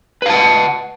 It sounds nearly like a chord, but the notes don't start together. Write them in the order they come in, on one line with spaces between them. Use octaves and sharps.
B4 F5 A5 F#5